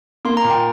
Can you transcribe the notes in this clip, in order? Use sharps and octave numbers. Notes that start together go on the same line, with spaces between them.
A#3 C6
A#5
A#2
G5